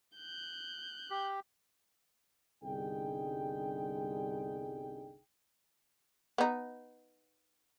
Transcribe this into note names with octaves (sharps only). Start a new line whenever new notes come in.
F#6 G6
G4
G1 C2 D3 D#4 G#4 G5
B3 D#4